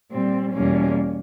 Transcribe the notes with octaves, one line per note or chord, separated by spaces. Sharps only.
A#2 G3 C4
E2 B2 G3 A#3 C#4